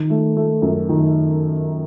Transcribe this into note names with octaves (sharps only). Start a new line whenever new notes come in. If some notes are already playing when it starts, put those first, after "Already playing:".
Already playing: D#3
A3
A3
F#2
D#3